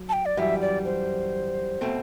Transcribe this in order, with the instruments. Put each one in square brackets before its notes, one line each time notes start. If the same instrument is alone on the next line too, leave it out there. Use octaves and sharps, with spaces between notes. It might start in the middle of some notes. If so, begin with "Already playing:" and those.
Already playing: [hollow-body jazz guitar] F#3
[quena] A5
G5
D5
[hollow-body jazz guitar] F#2 E3 G3 [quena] E5
[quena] D5
C5
[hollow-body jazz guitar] B2 A3 C4